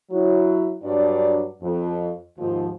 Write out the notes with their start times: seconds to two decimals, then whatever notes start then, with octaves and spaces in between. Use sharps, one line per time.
0.11 F#3 E4
0.83 G2 F#3 D4 D5
1.62 F2
2.38 D#2 G#2 F3